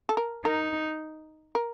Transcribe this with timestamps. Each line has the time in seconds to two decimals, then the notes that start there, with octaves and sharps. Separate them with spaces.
0.09 A4
0.17 A#4
0.45 D#4 A#4
1.55 A#4